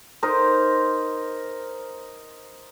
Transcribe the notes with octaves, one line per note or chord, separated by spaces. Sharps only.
D#4 A#4 C5